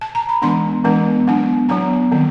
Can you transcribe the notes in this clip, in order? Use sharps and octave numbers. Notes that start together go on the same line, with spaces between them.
A5
A#5
B5
E3 G#3 B3 D4 C6
E3 G#3 B3 D4
F#3 B3 D4
F#3 B3 D4 A#5
D#3 G3 C4